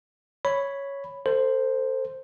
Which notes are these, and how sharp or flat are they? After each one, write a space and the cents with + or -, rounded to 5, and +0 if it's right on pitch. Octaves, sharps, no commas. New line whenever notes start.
C#5 +0 B5 +0
A4 +35 C5 +0